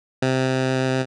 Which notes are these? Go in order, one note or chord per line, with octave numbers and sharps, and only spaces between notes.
C3